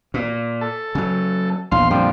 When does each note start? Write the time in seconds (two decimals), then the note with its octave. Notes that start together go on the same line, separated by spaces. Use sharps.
0.14 A#2
0.61 A4
0.95 C#3 F#3
1.71 A#1 E2 F5 C6
1.91 F2 A#2 D3 F3 G3